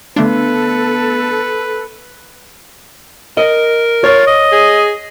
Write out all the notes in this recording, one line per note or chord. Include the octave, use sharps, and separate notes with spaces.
D3 A3 B3 D4 A4 B4
A#4 D#5
F4 C#5
D#5
G#4